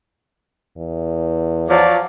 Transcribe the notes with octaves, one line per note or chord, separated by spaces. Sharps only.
E2
F3 F#3 D5